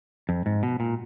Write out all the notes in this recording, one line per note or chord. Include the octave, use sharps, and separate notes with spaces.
F2
G#2
B2
A#2